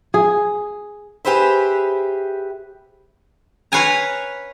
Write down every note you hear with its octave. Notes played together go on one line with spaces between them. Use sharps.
G#4
G4 G#4 B4 C5 E5
B4 C#5 F5 G#5 A#5